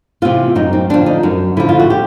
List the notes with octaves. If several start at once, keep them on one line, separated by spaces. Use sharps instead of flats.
C3 E3 F4
F#2 D#4
C4
D3 F3 D4
D#4
F#2
D3 F3 E4
F4
F#4
G4